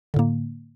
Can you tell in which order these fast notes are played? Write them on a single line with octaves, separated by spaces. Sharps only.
D3 A2 A#3